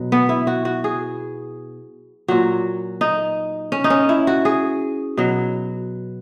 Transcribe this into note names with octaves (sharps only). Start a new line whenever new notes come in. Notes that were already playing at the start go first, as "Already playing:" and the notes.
Already playing: B2 F#3
B3
E4
F#4
F#4
G#4
A#2 F#3 F#4
D#4
C#4
D#4
C#4
E4
F#4
G#4
B2 F#3